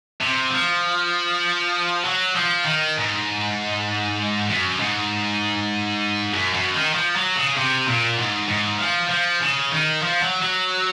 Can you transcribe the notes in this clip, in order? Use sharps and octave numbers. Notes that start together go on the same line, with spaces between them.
C3
F3
F#3
F3
D#3
G#2
F#2
G#2
F#2
F#2
D#3
F3
F#3
C#3
C3
A#2
G#2
G#2
F3
F3
C#3
D#3
F3
F#3
F#3